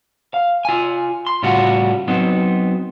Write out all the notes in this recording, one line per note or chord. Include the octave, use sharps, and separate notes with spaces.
F5
F4 G#5
C6
A2 C#3 G3 F4 F#4
F#3 B3 C4 D#4